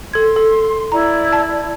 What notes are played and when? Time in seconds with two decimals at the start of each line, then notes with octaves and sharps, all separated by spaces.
0.14 A4 C6 G#6
0.36 A4
0.92 E4 D5 A#5
1.33 A5